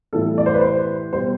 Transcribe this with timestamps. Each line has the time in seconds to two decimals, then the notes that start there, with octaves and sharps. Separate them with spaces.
0.13 A2 E3 G3 A4
0.38 D5
0.46 C5
0.54 B4
0.61 C5
1.13 G3 C5
1.17 B2